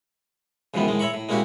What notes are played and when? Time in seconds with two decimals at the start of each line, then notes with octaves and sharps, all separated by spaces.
0.74 C#2 F#2 C3 D#3 E3 B3
0.88 A2 D#3 G#3
0.99 C#5 E5 A#5 B5 C#6
1.14 A2
1.29 G#3 A#3 C#4 E4 F#4 G4